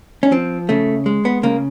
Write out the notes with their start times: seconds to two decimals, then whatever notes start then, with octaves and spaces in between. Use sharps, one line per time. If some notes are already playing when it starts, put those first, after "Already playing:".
0.23 C#4
0.32 F3 C4
0.69 C#3 A3
1.06 G#3
1.25 B3
1.43 C#3 A#3